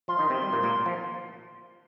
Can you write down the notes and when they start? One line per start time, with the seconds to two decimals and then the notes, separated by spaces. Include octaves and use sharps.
0.08 F3 F4 C6
0.19 D#3 D#4
0.30 C3 C4
0.41 G3 C6
0.53 A#2 A#3
0.63 A#2 A#3
0.86 F3